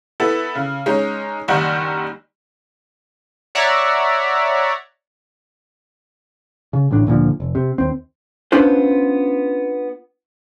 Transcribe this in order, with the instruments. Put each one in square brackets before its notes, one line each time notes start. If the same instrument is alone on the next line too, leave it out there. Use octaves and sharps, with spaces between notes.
[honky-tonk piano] B3 E4 A4
C#3
G#3 C#4 D#4
F#1 D#3 G3 D#4 F#5
[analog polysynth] C#5 D5 E5 F#5 A#5
[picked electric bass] C#3
A1 D2 A2 D4
D2 A#2 D3 F3
F1
C3
D#2 C4
[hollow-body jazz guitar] B3 C#4 D4 F4 B4 C5